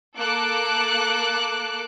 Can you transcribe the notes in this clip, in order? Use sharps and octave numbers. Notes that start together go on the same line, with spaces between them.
A#3 A4 D6 F#6